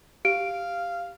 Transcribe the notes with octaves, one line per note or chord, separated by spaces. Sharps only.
G4 F5 D7